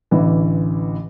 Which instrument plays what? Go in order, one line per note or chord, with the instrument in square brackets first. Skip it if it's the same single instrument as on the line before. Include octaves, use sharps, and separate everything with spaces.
[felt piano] A1 D3 E3